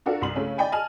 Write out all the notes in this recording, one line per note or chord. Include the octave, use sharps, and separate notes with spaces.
D4 F4 F#4 A4 A#4 D5
C2 C6 F#7
C#3 A3 C#4
D5 D#5 G5 G#5 B5
D#5 G#5 A5 F6 F#7